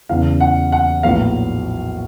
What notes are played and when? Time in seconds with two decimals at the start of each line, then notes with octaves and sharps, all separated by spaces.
0.09 E2 C#3 E3 F5
0.40 F#5
0.72 F#5
1.03 A#1 A2 F#3 B3 F5